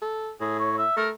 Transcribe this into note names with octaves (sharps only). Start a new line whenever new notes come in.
A4
A2 G#4
C#5
E5
A3 A#4